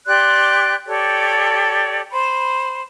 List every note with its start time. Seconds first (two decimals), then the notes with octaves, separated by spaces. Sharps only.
0.06 G4 D5 C6 F#6
0.87 G4 A4 C#5 D5
2.10 C5 B5